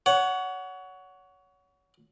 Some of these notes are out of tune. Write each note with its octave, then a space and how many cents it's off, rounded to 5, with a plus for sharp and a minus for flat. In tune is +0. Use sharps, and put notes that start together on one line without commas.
C#5 +25 F#5 +0